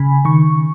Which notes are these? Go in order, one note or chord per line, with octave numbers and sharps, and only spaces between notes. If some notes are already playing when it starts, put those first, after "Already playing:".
Already playing: C#3 G#5 B5
D#3 C#6